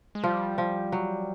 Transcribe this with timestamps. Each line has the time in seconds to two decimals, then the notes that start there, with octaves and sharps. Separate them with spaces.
0.15 G#3
0.23 F3 G3
0.58 F3
0.92 F#3